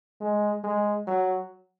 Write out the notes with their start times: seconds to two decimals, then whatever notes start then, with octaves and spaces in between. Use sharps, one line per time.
0.21 G#3
0.64 G#3
1.07 F#3